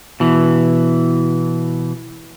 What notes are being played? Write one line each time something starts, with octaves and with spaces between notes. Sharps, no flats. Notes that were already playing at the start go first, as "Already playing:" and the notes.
B2 E3